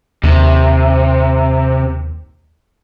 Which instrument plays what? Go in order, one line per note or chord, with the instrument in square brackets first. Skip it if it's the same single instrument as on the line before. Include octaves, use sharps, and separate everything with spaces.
[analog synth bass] D#2 [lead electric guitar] C3